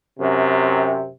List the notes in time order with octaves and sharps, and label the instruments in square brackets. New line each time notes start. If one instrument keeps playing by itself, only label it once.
[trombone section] F#2 C3